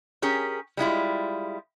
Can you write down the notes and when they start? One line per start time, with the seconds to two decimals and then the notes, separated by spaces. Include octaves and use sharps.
0.22 C#4 G4 G#4 A#4
0.77 G3 G#3 E4 F4